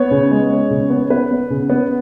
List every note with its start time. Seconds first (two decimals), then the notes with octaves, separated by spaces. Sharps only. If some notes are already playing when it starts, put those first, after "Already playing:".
Already playing: B3 C#5
0.11 C#3
0.31 G#3
0.50 B3
0.71 C#3
0.90 B3
1.10 B3 B4
1.31 B3
1.50 C#3
1.70 B3